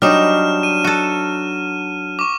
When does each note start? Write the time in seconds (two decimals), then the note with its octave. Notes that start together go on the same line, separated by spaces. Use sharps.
0.02 F#3 G3 D4 D#4 F6 E7
0.63 D#7
0.84 F#4 A4
2.19 C#6 D6